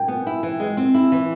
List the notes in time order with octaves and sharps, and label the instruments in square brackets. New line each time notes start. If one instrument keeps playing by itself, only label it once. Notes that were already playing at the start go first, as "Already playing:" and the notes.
Already playing: [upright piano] G5 G#5
[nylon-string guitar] B3
E4
E3
G#3
C4
E4
E3